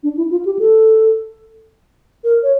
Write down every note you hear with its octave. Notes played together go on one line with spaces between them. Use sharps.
D4
E4
F4
G4
A4
A#4
C#5